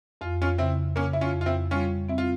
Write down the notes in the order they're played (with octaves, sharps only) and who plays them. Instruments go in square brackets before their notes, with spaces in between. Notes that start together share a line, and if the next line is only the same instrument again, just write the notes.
[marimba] F2 [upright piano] F4
[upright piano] C#4 F4
[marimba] C#3 [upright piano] C4 E4
[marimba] C#3 [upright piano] A#3 C#4
[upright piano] E4
C#4 F4
[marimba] F2
[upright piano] F4
C4 E4
[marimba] G3 [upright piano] C#4 F4
[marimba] C4 [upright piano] E4
[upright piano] F4